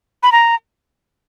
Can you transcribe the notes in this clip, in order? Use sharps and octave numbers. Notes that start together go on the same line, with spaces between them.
B5
A#5